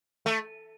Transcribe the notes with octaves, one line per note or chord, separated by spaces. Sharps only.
A3